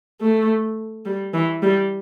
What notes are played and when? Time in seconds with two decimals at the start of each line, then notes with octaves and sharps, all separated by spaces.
0.21 A3
1.05 G3
1.34 E3
1.63 G3